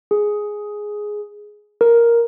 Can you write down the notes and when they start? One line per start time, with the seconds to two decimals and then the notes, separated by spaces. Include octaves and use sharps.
0.11 G#4
1.81 A#4